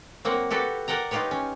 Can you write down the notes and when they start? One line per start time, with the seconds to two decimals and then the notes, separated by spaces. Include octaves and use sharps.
0.25 F#3 A#3 C4 F#5
0.51 F#4 G4 A4 B4
0.88 A#4 D5 F#5 G5 A#5
1.11 D#4 F4 G4 B4 C#5
1.31 C#4